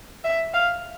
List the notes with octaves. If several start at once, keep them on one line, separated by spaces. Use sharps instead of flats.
E5
F5